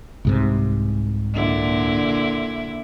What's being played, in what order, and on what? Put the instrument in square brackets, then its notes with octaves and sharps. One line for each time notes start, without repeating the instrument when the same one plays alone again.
[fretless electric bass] C2 G#2 C3
[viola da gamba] A#2 D3 E4